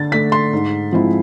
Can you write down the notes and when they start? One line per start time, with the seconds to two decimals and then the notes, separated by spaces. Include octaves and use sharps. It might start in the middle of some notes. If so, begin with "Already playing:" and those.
Already playing: D3 A6
0.12 A3 D4 B6
0.32 C6
0.53 G#2
0.92 F3 G#3 C4 E4